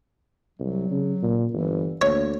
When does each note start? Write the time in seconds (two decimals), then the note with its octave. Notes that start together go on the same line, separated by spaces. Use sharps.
0.60 C2 F#3
0.91 C#3
1.23 A#2
1.53 G1 E3
2.02 D2 A#3 C#5